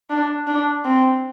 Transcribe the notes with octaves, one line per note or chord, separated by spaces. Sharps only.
D4
D4
C4